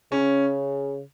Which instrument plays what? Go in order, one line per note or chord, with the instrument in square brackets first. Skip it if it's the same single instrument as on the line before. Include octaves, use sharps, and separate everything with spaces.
[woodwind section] C#3 [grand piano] C#4